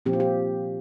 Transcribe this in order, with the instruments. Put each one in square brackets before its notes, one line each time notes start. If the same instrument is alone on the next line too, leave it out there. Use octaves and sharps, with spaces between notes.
[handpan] A#2 F3 C4 G4
F4
G4